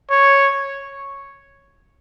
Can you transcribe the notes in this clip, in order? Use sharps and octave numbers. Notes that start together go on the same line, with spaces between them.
C#5